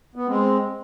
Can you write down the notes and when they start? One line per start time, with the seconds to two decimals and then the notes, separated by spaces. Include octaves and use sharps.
0.16 B3
0.27 G#3 C4